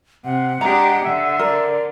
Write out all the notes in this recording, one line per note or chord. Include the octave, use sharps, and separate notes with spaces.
C3 F#5
G#3 D4 G4 A#5
D3 E5
A#4 D5